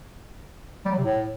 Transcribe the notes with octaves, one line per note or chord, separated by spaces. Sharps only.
G3
F#3
C3
A2